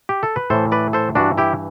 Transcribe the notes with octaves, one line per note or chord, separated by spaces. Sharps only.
G4
A4
B4
A2 E3 A4 C5
B4 D5
A4 C5
G2 E3 D4 F#4
E4 G4